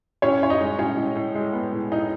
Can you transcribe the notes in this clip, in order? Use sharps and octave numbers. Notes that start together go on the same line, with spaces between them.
A2 C#4 C#5
A2 C#5
D#4 D#5
G#3
A2 C#4 C#5
A2
A2
G#3
B3
A2
A2 D#4 D#5